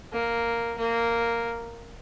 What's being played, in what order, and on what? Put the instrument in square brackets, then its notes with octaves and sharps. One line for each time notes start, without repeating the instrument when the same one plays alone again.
[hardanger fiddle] A#3
A#3